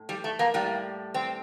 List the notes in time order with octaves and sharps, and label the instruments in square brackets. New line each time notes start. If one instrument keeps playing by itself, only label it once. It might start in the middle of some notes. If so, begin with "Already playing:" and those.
Already playing: [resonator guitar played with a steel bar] A2
G3
A3
A#3
A2 G3 A#3
C4